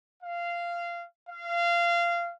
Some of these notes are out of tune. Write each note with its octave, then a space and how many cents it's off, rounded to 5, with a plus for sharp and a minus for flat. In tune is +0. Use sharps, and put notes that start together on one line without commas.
F5 -15
F5 -20